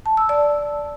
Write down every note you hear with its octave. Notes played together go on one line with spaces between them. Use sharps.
A5
E6
D5